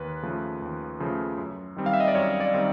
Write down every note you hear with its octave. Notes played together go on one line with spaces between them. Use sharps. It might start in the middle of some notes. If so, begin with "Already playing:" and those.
Already playing: D#2 B4
C#3 F3 A3
D#2
C#3 F3 A3
F#2
D#3 G3 C4
F5
E5
D#5
D5
F#2 C#5
D5
D#3 G3 C4